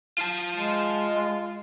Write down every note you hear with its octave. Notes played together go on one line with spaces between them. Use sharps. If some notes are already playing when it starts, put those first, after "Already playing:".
F4 A5
G#3